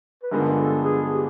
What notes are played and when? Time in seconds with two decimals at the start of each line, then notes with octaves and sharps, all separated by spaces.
0.23 B4
0.31 G2 D3 F3 G#3 B3 A#4
0.58 A4
0.84 G#4
1.10 G4